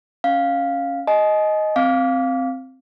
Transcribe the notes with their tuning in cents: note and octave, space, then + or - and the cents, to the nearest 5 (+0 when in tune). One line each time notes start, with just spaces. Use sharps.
C#4 +0 F5 +0
D#5 +0 G#5 +40
C4 +0 F5 +0 D6 -25